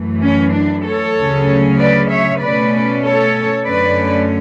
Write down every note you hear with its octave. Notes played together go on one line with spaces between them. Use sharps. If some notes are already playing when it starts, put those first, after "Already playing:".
Already playing: F#2 E3 A3
C#4
D4
A4 C#5
D2 C#3 F#3 C#4
B4 D5
C#5 E5
B2 A3 C#4 B4 D5
A4 C#5
F#2 D3 A3 C#4 B4 D5